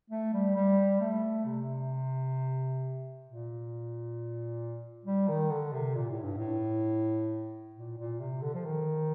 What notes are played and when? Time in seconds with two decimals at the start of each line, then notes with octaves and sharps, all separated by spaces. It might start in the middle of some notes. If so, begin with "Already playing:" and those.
0.10 A3
0.33 G3
0.56 G3
1.01 A3
1.45 C3
3.26 A#2
5.05 G3
5.28 D#3
5.50 D3
5.72 C3
5.95 A#2
6.10 A2
6.23 G2
6.37 A2
7.76 A#2
7.98 A#2
8.19 C3
8.42 D3
8.54 F3
8.65 D#3